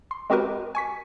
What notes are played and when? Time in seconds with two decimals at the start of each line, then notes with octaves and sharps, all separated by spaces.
0.11 C6
0.30 G#3 C4 F#4 G4 A#4 B4
0.75 G#5 C#6 B6